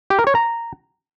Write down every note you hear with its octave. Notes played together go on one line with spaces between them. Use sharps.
G4
A#4
C#5
A#5